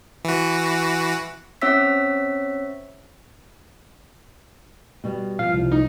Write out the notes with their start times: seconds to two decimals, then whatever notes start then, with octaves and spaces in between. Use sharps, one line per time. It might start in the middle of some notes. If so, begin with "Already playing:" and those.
0.25 E3 F#4
1.62 C4 C#4 C#5 E5 E6 B6
5.04 B2 G3
5.39 F3 F5
5.54 C2
5.72 D#4